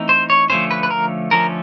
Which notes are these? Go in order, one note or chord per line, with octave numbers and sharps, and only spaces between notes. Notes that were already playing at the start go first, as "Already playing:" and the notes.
Already playing: E3 A3 C4 D#4
C5
C#5
D3 F3 A3 C#4 C5
B4
B4
A#4
D3 F3 A3 C#4 A#4